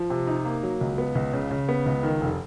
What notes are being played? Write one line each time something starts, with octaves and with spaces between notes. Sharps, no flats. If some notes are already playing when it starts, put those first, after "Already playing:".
Already playing: F3
C3
D#4
A#3
F#3
C#2
B3
C#2
C#3
C#3
B3
C#2
D#3
F1